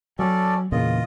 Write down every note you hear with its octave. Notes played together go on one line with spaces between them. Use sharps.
F#3 C#4 A4 D5
E2 A#2 C#3 F4 D#5